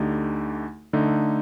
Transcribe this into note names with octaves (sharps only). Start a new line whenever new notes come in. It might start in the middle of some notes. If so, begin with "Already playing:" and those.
Already playing: D2 D3 A3 D#4 G4
D3 A3 D#4